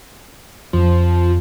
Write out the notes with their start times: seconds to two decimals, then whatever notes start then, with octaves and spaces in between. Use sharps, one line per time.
0.73 F2 F3